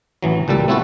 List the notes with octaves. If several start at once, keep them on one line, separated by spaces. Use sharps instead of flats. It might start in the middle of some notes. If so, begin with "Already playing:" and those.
A1 E3 F#3
C#2 A#2 G3 A4
A3 C4 E4 F#4 A4